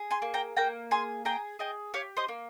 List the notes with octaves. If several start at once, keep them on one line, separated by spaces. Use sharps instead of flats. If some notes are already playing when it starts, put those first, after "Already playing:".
Already playing: G#4
G#5 C6
A#3
G5 A#5
A#3 G5 A#5
G#4 G#5 C6
G#4 G5 A#5
G#4 D#5 G5
G4 C#5 F5
C5 D#5
A#3